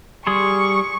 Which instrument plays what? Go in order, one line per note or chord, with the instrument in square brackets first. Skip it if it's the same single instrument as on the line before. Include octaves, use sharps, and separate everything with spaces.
[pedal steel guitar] G3 G#4 C6 [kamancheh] C#6